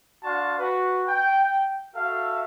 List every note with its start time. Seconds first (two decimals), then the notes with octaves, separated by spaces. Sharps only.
0.24 D4 F#4 F5 A5 C6 C#6
0.59 F#4 B4
1.08 G5
1.95 F#4 A4 E5 F5